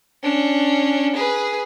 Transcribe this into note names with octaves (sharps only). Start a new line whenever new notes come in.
C#4 D4
G#4 B4